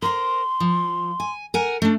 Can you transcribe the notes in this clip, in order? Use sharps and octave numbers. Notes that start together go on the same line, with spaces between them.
A#4 C5 C6
F3
G#5
A#4 F#5 G#5
A3 D4